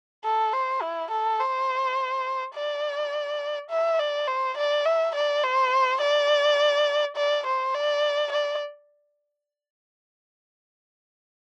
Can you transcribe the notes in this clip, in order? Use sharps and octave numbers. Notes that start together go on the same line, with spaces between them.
A4
C5
E4
A4
C5
D5
E5
D5
C5
D5
E5
D5
C5
D5
D5
C5
D5
D5